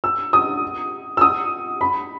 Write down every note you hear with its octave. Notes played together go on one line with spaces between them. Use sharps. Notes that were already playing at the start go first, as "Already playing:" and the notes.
E6
D#6
E6
D#6
B5